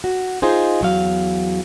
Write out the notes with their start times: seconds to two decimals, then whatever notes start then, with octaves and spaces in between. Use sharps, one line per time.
0.04 F#4
0.42 D#4 F4 G#4 C5
0.81 E2 F#3 F5